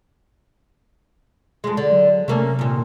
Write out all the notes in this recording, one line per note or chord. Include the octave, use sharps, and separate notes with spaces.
F2 G#3
D3
F#3
C3 A3 A#3 C#4
D#2 A#2